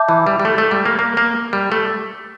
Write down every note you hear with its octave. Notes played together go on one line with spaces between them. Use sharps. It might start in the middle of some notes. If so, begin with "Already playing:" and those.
Already playing: E5 A5 D6 G6
E3
G3
G3
A3
A3
G3
A#3
A#3
A#3
G3
A3